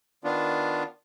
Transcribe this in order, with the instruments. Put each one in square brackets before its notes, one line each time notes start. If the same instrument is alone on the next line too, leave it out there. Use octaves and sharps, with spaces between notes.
[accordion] D#3 B3 D4 F4